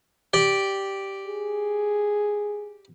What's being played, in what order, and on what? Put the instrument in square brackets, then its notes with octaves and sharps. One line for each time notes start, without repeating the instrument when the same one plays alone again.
[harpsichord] G4 D5 G5
[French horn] G#4